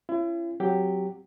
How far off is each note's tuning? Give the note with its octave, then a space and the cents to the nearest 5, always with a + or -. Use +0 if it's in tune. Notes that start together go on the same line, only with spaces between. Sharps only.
C#4 -15 E4 +40
F#3 +0 C4 +5 G4 +0